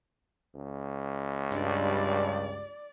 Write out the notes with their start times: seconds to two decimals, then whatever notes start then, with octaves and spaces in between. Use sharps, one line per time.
0.55 C#2
1.52 G2 D5